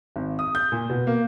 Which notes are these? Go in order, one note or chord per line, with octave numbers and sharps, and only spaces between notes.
G#1
D#6
G6
A#2
B2
A#3